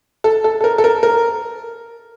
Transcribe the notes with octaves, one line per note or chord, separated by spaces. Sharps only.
A4
A4
A4
A#4
A4
A#4
A#4